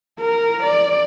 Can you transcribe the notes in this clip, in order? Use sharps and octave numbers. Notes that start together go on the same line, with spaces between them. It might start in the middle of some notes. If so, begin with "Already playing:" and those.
A#4
D5